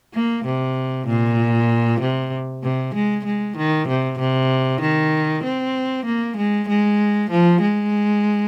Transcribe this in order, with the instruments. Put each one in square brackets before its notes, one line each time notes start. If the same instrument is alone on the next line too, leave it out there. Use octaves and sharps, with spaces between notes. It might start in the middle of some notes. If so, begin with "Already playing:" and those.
[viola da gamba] A#3
C3
A#2
C3
C3
G#3
G#3
D#3
C3
C3
D#3
C4
A#3
G#3
G#3
F3
G#3